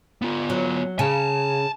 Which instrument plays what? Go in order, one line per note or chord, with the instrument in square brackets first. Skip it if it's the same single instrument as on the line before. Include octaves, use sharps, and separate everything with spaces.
[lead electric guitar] B3 F4
[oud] F#3
[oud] C#3 [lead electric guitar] G#5 A5